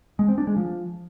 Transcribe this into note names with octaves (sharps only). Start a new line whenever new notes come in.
G#3
C4
D4
G#3
F3